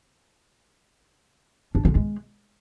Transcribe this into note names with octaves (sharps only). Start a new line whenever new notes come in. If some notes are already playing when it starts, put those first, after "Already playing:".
D4
D3
G#3